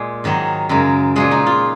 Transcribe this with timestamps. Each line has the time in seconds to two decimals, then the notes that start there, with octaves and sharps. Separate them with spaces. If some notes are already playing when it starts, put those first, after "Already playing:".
Already playing: A#2 G#3
0.24 G#2 D#3 F#3
0.69 F#2 C#3 G#3 A#4
1.16 A#2 F3 G#3 G#4
1.31 D#4
1.47 F4